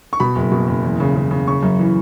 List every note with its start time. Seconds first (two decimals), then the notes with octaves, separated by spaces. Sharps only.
0.13 C#6
0.20 B2 B5
0.36 F#1
0.52 B2
0.67 F#1
0.84 E2
1.00 C#3
1.16 C#3
1.31 C#3
1.47 C#3 C#6
1.63 F#2
1.79 E3